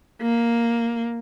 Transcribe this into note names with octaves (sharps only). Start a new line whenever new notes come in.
A#3